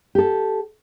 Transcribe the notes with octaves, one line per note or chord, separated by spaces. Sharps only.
G4 A4